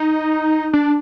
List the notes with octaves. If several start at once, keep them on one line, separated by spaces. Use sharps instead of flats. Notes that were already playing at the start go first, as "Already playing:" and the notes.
Already playing: D#4
D4